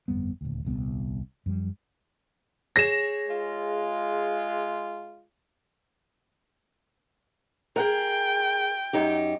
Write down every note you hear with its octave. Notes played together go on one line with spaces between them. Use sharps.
G1 F2 G3 B3
D#1 D2
D#1 C2 B3
F#2 F3 G3
G#4 C#5 A#6 E7
G#3 F4
G#4 A#4 G5
F#2 D#4 G4